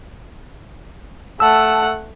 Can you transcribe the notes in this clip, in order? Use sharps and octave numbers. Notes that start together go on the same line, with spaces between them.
A3 F#5 A5 E6